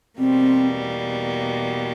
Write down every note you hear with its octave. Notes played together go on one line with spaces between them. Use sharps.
E2 B2 G3 A#3 C4